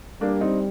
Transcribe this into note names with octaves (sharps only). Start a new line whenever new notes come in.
G3 A#3 D4
C4 D#4